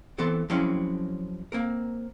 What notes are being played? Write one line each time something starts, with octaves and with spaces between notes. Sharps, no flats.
E3 B3 C4 A4 C5
F3 F#3 G#3 C4 C#4 E4
A#3 C4 A#4